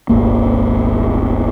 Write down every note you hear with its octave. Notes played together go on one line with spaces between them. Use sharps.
D#1 G#1 A#3